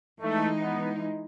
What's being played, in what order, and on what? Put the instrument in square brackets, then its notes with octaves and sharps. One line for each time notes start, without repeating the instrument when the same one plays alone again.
[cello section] E3 G#3 D#4 [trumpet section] A3
[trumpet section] B3